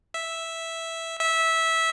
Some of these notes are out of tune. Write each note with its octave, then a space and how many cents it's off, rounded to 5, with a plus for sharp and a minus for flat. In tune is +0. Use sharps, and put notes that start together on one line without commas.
E5 -5
E5 -15